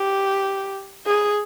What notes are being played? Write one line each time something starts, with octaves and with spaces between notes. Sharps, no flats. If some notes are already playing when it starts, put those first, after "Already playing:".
Already playing: G4
G#4